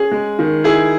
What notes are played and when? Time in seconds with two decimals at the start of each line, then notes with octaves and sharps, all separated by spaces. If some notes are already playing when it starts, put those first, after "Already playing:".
Already playing: C#4 G#4
0.12 G#3
0.39 D#3
0.64 E4 G#4